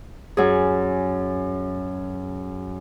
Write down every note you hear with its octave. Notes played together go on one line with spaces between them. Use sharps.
F#2 G#4